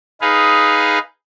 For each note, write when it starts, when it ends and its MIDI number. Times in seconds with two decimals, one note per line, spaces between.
0.21 0.99 63
0.21 0.99 68
0.21 0.99 71
0.21 0.99 77